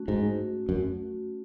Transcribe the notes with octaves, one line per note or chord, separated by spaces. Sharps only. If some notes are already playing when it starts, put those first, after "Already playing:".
Already playing: A3 C#4 F#4
G#2
F#2